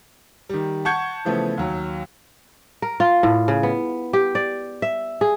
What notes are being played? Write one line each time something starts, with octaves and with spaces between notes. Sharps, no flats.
D#3 G3
F#5 A5 C#6 G6 G#6 C#7
C#3 E3 F3 A3 B3
D#2 F#3
A#4
F4
A2
C#3
B3
G4
D5
E5
G#4